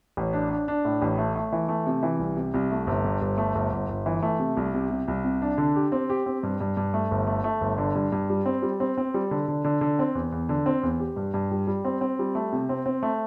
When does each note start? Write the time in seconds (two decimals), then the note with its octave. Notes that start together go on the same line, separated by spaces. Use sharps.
0.17 A1
0.33 D4
0.51 D4
0.68 D4
0.85 A2
1.02 A1
1.18 A3
1.36 A3
1.52 E3
1.69 A3
1.87 C3
2.03 E3
2.19 C2
2.37 C3
2.54 C2
2.71 A3
2.87 G1
3.05 G2
3.21 G1
3.38 A3
3.55 G1
3.72 G1
3.89 G1
4.06 E3
4.23 A3
4.40 C3
4.57 C2
4.74 C3
4.90 C3
5.08 C2
5.25 C3
5.42 D4
5.58 D3
5.76 G4
5.92 C4
6.10 G4
6.26 C4
6.43 G2
6.61 G2
6.77 G2
6.94 A3
7.11 G1
7.27 A3
7.44 A3
7.61 G1
7.78 D3
7.95 G2
8.12 G2
8.30 G3
8.46 C4
8.62 G3
8.80 C4
8.98 C4
9.14 G3
9.31 D3
9.48 D3
9.65 D3
9.81 D3
9.99 C4
10.15 E2
10.32 E2
10.49 D3
10.66 C4
10.83 E2
11.00 G4
11.16 G2
11.34 G2
11.51 G3
11.67 G3
11.85 C4
12.01 C4
12.19 G3
12.35 A3
12.52 C3
12.69 C4
12.86 C4
13.03 A3